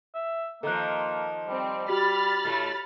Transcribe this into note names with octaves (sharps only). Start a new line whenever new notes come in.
E5
D#3 F3 A#3 A4 A#5 F#6
G3 C4
F#4 G4 B5 F6 A6 B6
A2 A3